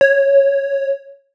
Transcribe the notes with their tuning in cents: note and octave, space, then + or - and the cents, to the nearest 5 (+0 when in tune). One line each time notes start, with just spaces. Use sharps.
C#5 -5